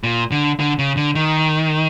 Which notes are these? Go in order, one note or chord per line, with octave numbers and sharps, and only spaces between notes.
A#2
D3
D3
C#3
D3
D#3